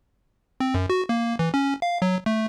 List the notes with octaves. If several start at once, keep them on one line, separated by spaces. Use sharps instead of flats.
C4
F#2
F#4
A#3
E3
C#4
F5
F#3
A3